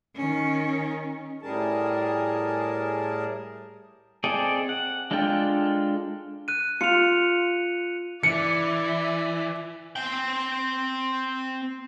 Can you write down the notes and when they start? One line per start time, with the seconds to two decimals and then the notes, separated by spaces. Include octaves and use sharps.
0.16 D#3 C#4
1.42 A2 G3 G#4 A#4 A5
4.24 C4 G#4 A4 D5 D#5
4.69 F#5
5.11 G#3 D4 F4 A4 G5
6.48 F#6 D#7
6.81 F4 C#7 F7
8.23 E3 D5 E5 C#7
9.96 C4 G5